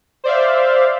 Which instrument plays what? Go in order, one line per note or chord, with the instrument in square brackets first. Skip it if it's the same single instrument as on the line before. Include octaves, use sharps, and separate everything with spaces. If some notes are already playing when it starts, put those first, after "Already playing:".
[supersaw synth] C5 D5 E5 F5